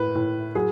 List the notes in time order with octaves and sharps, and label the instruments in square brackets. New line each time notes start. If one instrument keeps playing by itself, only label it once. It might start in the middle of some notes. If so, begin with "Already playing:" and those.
Already playing: [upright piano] A2 B4
A2
F#3 G#4